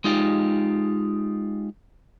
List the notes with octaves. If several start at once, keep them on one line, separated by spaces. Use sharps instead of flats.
G#3 D#4 F4 G4